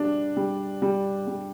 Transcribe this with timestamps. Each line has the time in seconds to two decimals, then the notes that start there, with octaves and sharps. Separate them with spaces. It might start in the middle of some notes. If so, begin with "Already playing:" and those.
Already playing: G3 D4
0.37 G3
0.82 G3
1.27 G3